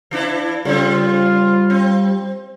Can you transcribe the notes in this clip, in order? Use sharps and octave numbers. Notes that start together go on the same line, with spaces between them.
E3 D4 E4
C#3 G3 C4 F4
C4